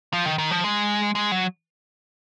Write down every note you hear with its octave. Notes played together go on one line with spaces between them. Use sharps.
F3
D#3
D#3
F3
G#3
G#3
F#3